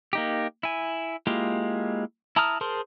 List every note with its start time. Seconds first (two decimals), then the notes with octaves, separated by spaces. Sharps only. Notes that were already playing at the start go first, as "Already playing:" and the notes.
0.13 A#3 D#4 G4
0.63 E4 G#5
1.27 G#3 A#3 E4 F4 G4
2.36 E4 A5 A#5 D#6 F6
2.61 G#4 A#4 C5 A5 C6